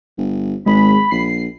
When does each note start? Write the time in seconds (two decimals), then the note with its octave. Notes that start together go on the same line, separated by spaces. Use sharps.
0.18 G1
0.66 G#1 G#3 B5
1.11 A#1 C7